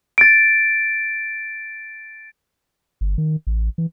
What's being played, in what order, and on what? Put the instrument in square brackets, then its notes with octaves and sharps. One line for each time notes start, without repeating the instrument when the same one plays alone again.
[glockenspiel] A6 D7
[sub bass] G1
D#3
A1
E3